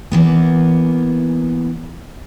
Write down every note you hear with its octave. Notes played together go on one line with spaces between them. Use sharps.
E3 A#3 B3